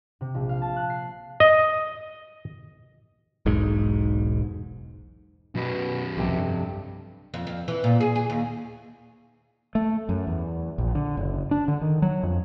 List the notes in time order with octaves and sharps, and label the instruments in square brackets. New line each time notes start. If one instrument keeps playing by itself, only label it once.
[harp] C3
A#1
F5
A5
F#6
C7
[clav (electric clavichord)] D#5
[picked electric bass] E1 B1 G#2
[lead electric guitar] F#2 B4 [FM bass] B2
[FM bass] C2 [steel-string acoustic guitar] F2 C3
[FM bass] G2
[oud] F2
F2
E3
A#2
G#4
G#4
D#2
[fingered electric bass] A3
F#2
E2
A#1
D3
F#1
D4
D3
D#3
F#3
F2